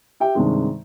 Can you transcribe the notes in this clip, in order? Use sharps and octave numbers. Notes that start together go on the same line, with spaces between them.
G4 E5 G5
G2 C3 D#3 G#3